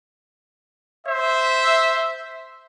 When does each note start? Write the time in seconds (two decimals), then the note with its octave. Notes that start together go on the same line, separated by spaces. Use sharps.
1.07 C5 E5